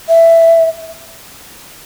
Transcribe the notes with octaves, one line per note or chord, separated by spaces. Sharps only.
E5